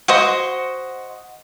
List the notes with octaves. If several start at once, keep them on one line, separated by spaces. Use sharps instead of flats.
F#4 C5 D#5